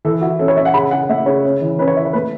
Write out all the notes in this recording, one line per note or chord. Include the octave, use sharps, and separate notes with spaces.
E3 A4
E4 F#4
C#4 A4
C#5
C#4 E5
F#5
C#3 B5
C#3 F#5
A3 E5
C#3 C#5
C#4
E3
C#4 B4
C#5
E4 E5
C#5
A3 B4